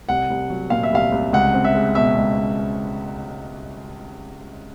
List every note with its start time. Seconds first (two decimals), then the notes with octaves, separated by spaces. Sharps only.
0.09 C2 F#5
0.30 C2
0.50 F#3
0.70 A#2 F5
0.83 E5
0.92 C2 F5
1.12 C2
1.33 C#2 F#5
1.54 C4
1.65 E5
1.75 G#3
1.95 B2 E5
2.17 C#2